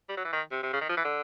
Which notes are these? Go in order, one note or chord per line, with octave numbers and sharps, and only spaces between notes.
G3
F#3
E3
D#3
C3
C3
C#3
D#3
F3
E3
D3